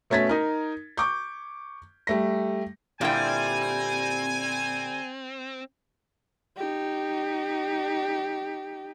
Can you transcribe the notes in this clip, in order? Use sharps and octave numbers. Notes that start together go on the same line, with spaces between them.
B2 A3 C#4 G#6 A6 B6
D#4 A#4
C#6 D6 G6
G3 A3 A#6
A#2 D3 G3 C4 E4 G5 G#5
D#4 G4